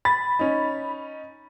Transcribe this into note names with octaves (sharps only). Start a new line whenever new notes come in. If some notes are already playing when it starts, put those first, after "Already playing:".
B5 A6
C#4 D#4